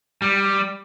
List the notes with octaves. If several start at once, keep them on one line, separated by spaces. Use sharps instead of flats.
G3